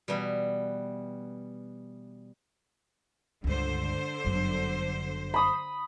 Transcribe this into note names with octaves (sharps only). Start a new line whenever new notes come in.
B2 E3 G3
C#2 G2 D3 C5
G1 F#2
B5 D#6